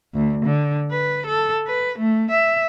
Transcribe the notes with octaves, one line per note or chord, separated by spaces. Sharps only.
D2
D3
B4
A4
B4
A3
E5